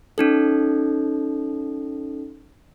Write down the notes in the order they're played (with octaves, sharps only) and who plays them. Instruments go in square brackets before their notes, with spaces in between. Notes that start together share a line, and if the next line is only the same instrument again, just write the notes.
[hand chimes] C#4 D#4 A4